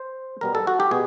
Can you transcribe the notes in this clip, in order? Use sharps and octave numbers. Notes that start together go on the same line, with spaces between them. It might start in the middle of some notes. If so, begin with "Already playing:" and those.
Already playing: C5
B2 G3 B3 A#4
A4
F#4
G4
B2 B3 G#4